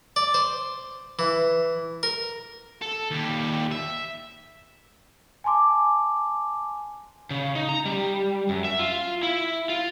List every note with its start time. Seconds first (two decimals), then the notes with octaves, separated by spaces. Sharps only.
0.16 D5
0.34 C5
1.19 E3
2.03 A#4
2.82 A4
3.11 D#2 G3
3.72 E5
5.44 G#5 A5 C6 D6
7.30 C#3
7.55 D#4
7.69 A#5
7.85 G3
8.49 F#2
8.65 E5
8.79 F4
9.23 E4
9.69 F4